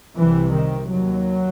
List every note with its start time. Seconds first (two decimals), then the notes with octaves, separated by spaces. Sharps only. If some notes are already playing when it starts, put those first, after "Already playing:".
0.17 C2 C3 E3
0.54 D#3
0.91 D#2 F#3